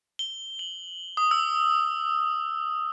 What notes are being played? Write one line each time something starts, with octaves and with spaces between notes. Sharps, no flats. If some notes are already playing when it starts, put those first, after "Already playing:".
G7
F#7
D#6
E6